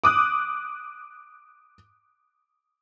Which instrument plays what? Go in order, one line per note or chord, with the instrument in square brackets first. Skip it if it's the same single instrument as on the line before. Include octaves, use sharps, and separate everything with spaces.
[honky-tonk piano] D6 D#6 F#6